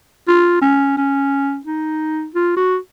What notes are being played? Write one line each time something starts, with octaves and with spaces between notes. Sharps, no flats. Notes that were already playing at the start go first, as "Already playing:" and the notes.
F4
C#4
C#4
D#4
F4
F#4